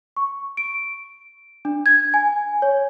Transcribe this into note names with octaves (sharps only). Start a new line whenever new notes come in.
C#6
D7
D4
G#6
G#5
C#5